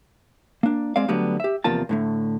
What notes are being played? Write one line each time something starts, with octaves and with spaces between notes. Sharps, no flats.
A#3 D4
G#3 C4 D5 F5
D3 F#3 G3 A3 B3
G4 E5
E2 C3 F3 A#3 F4 A5
A2 D3 A3